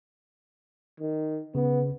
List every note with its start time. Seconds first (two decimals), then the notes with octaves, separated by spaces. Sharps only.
1.00 D#3
1.55 C#3 B3